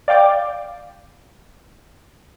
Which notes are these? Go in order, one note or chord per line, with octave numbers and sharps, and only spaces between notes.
D5 F5 G5 D6